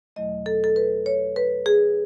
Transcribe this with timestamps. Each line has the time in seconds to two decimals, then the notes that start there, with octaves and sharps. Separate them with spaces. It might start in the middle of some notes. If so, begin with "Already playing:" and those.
0.16 E2 B2 F#3 A3 D#5
0.46 A4
0.64 A4
0.76 B4
1.06 C#5
1.36 B4
1.66 G#4